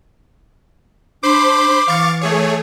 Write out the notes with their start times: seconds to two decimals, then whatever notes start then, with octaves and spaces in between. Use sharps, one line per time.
1.23 D4 C5 B5 C6 D6
1.88 E3 F5 C#6 A6
2.21 A3 G#4 C#5